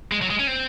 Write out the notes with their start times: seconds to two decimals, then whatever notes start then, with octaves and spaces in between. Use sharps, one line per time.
0.12 G#3
0.21 F#3
0.30 G#3
0.39 C#4
0.47 C4